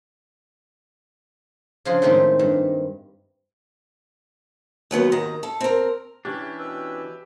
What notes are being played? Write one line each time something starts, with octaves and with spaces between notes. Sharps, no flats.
C#3 F3 D4 F4 G#4
A2 D#3 G#3 C4 G4
G2
D#2 F#3 B3 F4
D#2 D#3 A#5
A4
C4 A#4
E3 C#4 D4 G4
B2 B4 E6